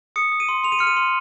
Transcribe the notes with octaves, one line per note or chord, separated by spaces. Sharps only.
D#6 C#7
D#6
D#7
C6
C6 F7
D#7
F6 C#7
D#7
C6